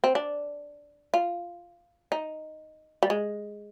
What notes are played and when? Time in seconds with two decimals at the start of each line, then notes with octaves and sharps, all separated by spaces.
0.04 C4
0.15 D4
1.14 F4
2.12 D#4
3.03 G3
3.10 G#3